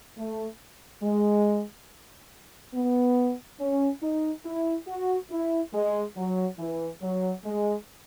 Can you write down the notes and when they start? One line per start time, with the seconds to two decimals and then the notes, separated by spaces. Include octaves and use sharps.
0.18 A3
1.03 G#3
2.74 B3
3.60 C#4
4.03 D#4
4.45 E4
4.88 F#4
5.31 E4
5.74 G#3
6.17 F#3
6.59 E3
7.02 F#3
7.45 G#3